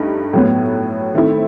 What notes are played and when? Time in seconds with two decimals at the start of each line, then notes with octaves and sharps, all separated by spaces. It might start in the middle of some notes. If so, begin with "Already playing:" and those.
Already playing: G2 A3 D#4
0.33 A2 F#3 B3
1.14 D#3 A3 C4 E4